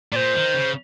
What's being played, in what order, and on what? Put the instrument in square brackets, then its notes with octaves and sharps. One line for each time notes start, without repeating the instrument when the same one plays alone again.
[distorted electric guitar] A#2 [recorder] C5 D5
[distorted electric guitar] D#3
C#3